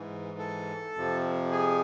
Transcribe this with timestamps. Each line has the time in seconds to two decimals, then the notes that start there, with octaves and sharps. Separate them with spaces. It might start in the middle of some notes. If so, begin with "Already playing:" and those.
Already playing: G#2 E3
0.38 A4
0.95 F2 C3 F3
1.52 G#4